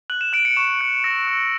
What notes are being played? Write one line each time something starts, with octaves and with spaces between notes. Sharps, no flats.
F#6 F#7
E7
F#6 D7
C#7
C#6 E7
F#6 D7
E6 A#6
E6